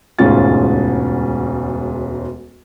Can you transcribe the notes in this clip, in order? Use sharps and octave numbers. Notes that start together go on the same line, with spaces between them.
E1 D2 G#2 C#4 F4 A6